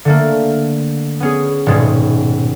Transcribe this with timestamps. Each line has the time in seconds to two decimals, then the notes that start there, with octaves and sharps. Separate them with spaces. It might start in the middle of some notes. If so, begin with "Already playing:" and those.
0.05 D3 A3 A#3
1.20 B3 C#4 G#4
1.66 D#1 G#2 B2 G#3 C#4